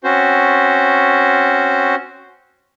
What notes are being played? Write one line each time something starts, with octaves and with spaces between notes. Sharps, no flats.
C4 C#4 F#4 C5